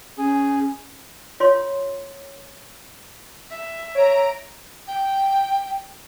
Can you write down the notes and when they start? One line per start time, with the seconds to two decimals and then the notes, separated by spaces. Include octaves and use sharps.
0.18 C#4 G#4
1.40 F4 C#5 C6
3.51 E5
3.95 C#5 A#5 D7
4.88 G5